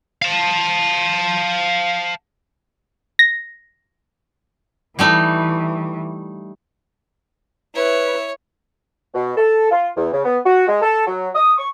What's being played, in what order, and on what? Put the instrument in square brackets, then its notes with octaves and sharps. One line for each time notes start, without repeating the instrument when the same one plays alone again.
[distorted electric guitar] F5 A5
[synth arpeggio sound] A#6
[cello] E3 [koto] G3 A3 D#4
[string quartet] E4 [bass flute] B4 [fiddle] C#5
[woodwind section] B2
A4
F4
E2
C#3
B3
F#4
G#3
A4
F#3
D#6
C#6